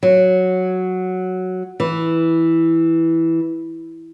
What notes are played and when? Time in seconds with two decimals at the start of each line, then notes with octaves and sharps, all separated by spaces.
0.03 F#3
1.80 E3